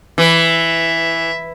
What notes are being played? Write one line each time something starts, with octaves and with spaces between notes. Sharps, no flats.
E3 E5